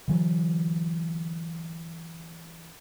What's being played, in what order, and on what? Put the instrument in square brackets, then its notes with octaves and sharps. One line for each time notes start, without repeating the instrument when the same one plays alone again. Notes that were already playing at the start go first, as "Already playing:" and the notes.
[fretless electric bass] D3 E3 F#3